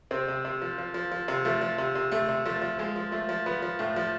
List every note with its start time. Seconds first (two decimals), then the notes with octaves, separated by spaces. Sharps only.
0.11 C3 C4
0.28 C3
0.45 C3
0.62 F3
0.78 F3
0.94 F3
1.12 F3
1.28 C3
1.45 F3 A3
1.61 F3
1.78 C3
1.95 C3
2.12 C3 A3
2.29 C3
2.45 F3 A3
2.62 F3
2.79 F3 G#3
2.96 F3
3.12 F3 A3
3.29 F3
3.46 F3 B3
3.62 F3
3.79 A2 A3
3.96 F3